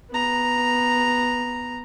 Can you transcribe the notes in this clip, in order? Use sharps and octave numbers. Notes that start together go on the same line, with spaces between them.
B3 A#5